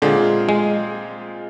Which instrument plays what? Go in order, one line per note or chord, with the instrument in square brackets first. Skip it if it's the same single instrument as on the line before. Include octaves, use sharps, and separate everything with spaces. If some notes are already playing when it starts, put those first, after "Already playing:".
[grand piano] A#2 G#3 C4 F4 G#4 [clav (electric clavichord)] D3
[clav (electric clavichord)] G#3